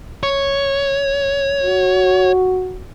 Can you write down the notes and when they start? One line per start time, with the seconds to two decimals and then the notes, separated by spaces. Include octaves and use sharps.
0.23 C#5
1.63 F#4